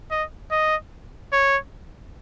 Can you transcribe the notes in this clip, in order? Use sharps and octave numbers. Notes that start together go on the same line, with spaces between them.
D#5
D#5
C#5